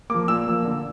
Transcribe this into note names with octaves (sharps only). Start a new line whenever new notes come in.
F3 A#3 D6
A#2 E6
F3 A#3
D3